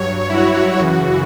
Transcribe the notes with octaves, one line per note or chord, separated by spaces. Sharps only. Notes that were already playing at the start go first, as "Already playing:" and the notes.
Already playing: G2 F#3 C#5
E4
F#4
F#2 C#3 E3 F#4